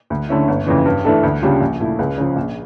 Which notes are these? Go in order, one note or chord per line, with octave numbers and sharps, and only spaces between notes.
D2
D3 A3 C#4 E4
G1
F2 C#3 E3
G2
E3 A3 D4 A4
D2
C#3 G3 D4 F4
A#1
A#2 A3 E4
C#2
C#3 F3
A#1